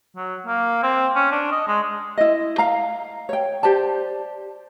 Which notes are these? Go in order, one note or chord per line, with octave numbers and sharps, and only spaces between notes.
F#3
A#3
C4
C#4
D4
D#5
G#3
E4 D#5
F5 A#5
C#5 G5
G4 C5 D5 A5